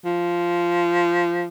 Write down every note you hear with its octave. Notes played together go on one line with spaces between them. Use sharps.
F3